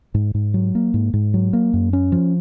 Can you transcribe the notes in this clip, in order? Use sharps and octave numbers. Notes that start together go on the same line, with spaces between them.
G#2
G#2
F#3
A#3
G#2
G#2
F#3
A#3
F#2
C#4
F3